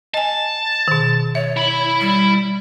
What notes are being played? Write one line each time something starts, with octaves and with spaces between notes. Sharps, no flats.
D#5 G#5 A5
B2 D#3
C#5 E5
E4 B5
G3